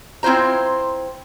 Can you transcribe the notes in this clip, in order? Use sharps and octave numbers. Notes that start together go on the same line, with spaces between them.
C4 E4 F4 C5 A#5